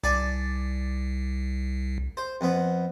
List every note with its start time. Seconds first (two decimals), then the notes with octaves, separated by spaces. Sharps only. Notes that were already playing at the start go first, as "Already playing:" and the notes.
0.04 C2 D5 G#5 A5
2.17 C5
2.41 F2 B3